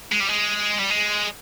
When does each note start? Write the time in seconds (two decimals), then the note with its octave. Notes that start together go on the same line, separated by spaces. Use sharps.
0.12 G#3
0.21 G3
0.29 G#3
0.79 G3
0.90 G#3